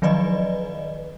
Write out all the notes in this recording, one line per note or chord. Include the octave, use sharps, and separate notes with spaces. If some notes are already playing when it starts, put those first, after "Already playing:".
D#3 F3 F#3 B4 D5 D#5